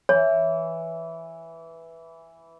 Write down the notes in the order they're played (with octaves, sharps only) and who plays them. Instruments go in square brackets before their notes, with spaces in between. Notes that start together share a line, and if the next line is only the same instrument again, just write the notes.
[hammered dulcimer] E3 [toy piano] C#5